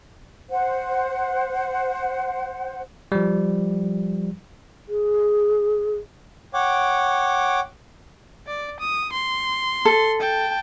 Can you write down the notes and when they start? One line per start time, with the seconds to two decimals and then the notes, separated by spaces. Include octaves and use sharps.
0.50 C5 F#5
3.12 F3 G3
4.87 G#4
6.54 C#5 F#5 G5 D6
8.47 D5
8.80 D#6
9.13 C6
9.85 A4
10.20 G5 A5